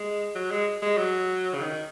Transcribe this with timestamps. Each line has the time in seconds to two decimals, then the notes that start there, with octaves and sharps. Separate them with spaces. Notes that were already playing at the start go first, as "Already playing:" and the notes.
Already playing: G#3
0.35 F#3
0.51 G#3
0.82 G#3
0.98 F#3
1.55 C#3
1.62 D#3